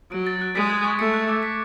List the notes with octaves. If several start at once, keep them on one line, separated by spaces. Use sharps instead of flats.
F#3 D7
A6
F#6
G#3 B6
G#6
C#6
A3 C#7
F#6
D6
B6